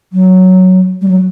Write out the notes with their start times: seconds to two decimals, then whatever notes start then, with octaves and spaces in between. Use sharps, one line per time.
0.13 F#3
1.02 G3
1.08 F#3